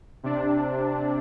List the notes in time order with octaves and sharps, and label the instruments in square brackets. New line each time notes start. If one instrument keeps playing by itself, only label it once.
[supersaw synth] C3 D4